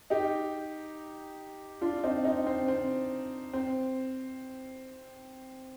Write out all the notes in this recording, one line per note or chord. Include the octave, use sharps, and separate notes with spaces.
D#4 G4
D4 F4
C4 D#4
C4 D#4
C4
C4
C4